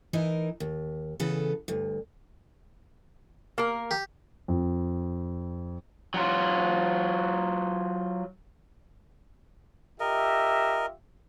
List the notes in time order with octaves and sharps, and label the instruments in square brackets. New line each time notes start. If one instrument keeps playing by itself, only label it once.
[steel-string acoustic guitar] E3 D#4 E4 A#4
D#2
C#3 E3 B3 A4
D2 G2
[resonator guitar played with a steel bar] A#3 A#4
[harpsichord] G4
[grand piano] F2
[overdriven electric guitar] F#3 F4
[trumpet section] F4 G4 E5 [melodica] A#4 D#5